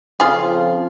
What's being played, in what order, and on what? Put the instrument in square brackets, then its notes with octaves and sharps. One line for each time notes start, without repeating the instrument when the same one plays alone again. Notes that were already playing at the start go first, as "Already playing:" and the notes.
[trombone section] F2 C#3 F3 [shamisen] F4 G#4